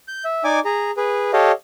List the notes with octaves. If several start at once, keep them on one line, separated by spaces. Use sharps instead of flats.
G6
E5
D#4 D5 G#5 D6
G#4 A#5
G#4 B4
G4 A4 C#5 D#5 F5